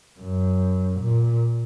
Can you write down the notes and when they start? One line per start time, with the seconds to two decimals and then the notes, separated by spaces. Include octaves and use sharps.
0.20 F#2
1.00 A#2